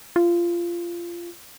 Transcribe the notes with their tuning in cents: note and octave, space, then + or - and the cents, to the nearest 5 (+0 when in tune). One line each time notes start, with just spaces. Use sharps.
F4 -20